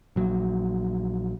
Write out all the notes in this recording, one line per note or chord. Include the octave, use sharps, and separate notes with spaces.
A#1 F#3